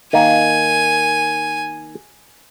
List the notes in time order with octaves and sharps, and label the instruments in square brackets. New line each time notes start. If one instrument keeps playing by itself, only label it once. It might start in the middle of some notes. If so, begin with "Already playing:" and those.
[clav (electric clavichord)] D#3 A#3 [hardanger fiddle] G#5